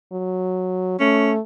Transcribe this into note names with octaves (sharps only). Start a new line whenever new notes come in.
F#3
A3 C#4